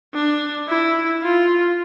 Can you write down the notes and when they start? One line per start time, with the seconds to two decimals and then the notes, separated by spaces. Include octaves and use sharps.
0.14 D4
0.69 E4
1.23 F4